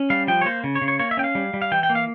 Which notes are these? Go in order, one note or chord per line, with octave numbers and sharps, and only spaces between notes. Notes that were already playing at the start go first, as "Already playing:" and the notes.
Already playing: C#4
G3 F5
F3 G5
C#5
A#3 C5
C#3
C#5
C#3
C#5
A#3 C#5
E5
C#4 G5
F5
G3
G3
F5
E3 G5
G5
A#3
F5